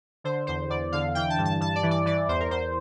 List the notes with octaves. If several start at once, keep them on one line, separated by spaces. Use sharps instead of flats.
D3 C5
E2 C5
E2 D5
D3 F5
E3 G5
A5
G2
A5
G2 A5
D5
E3
D5
E3 D5
E2 C5
A#4
E2 C5